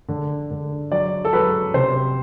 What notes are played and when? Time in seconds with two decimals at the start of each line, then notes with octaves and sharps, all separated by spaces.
0.08 D3
0.51 D3
0.92 F#3 D5
1.25 A4
1.33 F#3 B4
1.74 C3 C5